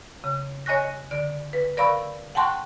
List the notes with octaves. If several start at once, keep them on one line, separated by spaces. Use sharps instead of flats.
C#3
C#5 D#5 G#5 C#6 F#6 A#6
D3 D5
B4
A#4 D5 F5 B5 C#6 E6
F#5 G5 A5 C6 C#6 F#6